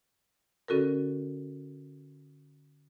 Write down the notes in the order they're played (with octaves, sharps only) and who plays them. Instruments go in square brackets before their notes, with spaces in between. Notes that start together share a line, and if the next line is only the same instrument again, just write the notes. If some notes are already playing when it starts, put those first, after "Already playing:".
[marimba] D3 C#4 F#4 A4 A#4